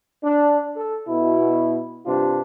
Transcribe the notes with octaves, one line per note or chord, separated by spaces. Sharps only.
D4
A4
B2 E4
G2 C3 D4 F4